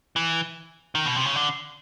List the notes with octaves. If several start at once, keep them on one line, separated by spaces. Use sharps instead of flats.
E3
D#3
B2
C3
C#3
D3